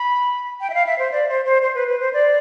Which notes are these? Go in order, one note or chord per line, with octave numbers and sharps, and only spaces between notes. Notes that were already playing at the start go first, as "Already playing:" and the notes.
Already playing: B5
G5
E5
F5
E5
C5
D5
C5
C5
C5
B4
B4
C5
D5